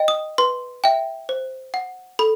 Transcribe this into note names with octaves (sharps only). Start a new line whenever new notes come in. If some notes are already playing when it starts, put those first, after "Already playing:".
Already playing: D#5 G5
D#6
B4 C6
E5 G5
C5
F#5
A4 B5